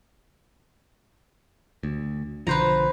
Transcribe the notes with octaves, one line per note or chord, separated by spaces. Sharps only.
D2
B1 D3 F3 B4 C5 A#5